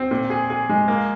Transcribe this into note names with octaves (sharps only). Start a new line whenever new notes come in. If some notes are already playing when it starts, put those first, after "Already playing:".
Already playing: C4
A#2
G#4
G#4
G#3
A#3